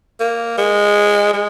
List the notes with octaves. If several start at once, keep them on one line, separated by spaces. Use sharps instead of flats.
A#3
G#3
G#3